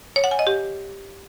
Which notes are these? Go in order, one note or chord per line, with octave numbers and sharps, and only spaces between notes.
C#5
F#5
G#5
D#5
G4